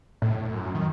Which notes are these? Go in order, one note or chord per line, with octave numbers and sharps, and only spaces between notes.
A2
F#2
D#3